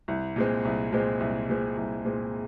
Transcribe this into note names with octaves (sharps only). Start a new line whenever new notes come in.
C2
A#2 G#3 C4
C2
A#2 G#3 C4
C2
A#2 G#3 C4
C2
A#2 G#3 C4